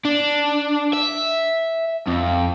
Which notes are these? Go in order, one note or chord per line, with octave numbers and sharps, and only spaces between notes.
D4
E5
F2